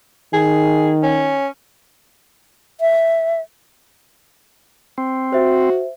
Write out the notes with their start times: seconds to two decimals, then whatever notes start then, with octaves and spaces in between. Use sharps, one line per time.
0.33 D#3 G#4
1.03 C#4
2.81 E5
4.98 C4
5.33 F#4 C5 E5